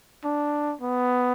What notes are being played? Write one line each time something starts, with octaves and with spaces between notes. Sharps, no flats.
D4
B3